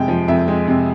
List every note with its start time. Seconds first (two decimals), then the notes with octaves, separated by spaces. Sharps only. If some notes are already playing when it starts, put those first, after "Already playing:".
Already playing: F2 C3 G#3 G5
0.08 F3
0.28 F2 E5
0.48 G#3
0.68 C3